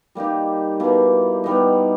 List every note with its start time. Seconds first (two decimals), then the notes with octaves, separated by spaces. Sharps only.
0.15 G3 A#3 D#4 G4
0.80 B2 A#3 E4
1.44 G3 B3 D#4